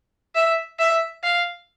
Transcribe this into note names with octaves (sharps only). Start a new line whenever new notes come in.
E5
E5
F5